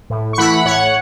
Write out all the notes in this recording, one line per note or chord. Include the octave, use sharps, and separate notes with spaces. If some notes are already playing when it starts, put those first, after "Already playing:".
A2
C#6
E3 A3 E4 F#5 B5
A2 C#5 F#5